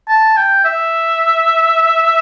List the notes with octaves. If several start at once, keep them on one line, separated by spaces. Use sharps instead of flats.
A5
G5
E5